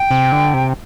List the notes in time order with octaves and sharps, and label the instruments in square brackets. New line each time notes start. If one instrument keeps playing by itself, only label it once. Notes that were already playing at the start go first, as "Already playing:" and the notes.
Already playing: [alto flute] G5
[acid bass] C3
D3
C3